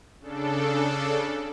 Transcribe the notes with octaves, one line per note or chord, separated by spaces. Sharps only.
C#3 D4 A4